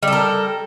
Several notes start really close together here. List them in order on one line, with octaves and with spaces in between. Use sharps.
G3 A4 A#4